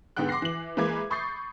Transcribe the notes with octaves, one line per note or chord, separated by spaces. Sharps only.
G#2 D3 B3 F#5 G5 F#6
C6 D6 F#6 A#6 C7
E3 F#7
E3 G#3 A#3 B4 D6 G#6
B5 C#6 D#6 G6 A6 C7